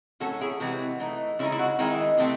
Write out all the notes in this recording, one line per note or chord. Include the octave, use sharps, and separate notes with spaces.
A2 F#3 C#4 F#4 A4
E4 G#4
C3 E3 G#3 C4 F#4
E3 A3 D#4
C#3 G#3 D#4 E4
E4
F#4
D#3 G#3 C4 D#4 E4
C3 E3 A3 C4